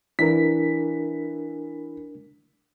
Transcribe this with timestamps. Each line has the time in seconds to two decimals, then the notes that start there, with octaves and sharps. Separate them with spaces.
0.19 E3 D4 A#4 B6